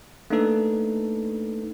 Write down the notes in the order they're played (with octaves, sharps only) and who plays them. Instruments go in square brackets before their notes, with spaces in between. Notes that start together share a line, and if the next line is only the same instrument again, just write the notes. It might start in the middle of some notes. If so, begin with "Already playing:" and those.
[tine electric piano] A3 A#3 D4 D#4 A4 B4